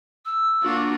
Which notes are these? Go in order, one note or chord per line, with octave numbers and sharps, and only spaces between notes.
E6
A#3 D4 F4 F#4